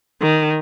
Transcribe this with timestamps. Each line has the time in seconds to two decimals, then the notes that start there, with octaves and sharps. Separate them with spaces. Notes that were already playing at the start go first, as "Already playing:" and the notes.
0.21 D#3